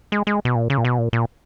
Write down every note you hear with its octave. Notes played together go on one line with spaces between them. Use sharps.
G#3
G#3
B2
A#2
C#3
A#2
B2
A#2
A#2